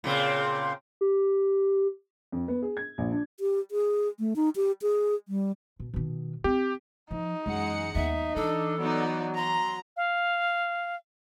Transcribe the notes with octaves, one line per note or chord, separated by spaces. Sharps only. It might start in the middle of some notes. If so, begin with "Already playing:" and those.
A#2 C#3 C4
G4
F2
B3
G#4
G#6
A#1
D4
G4
G#4
A3
D#4
G4
G#4
G3
B2
B2 D#3
C4 G4
F3 D#4
F#2 E3 G#3 F#5 C#7
D#2 B3 D#4 E5
E3 D4 A4
F#3 B3 D#4 D5
A#5 C6
F5